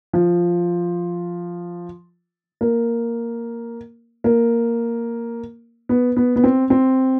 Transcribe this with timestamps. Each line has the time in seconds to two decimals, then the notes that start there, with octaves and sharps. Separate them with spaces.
0.13 F3
2.61 A#3
4.24 A#3
5.89 B3
6.17 B3
6.36 B3
6.44 C4
6.70 C4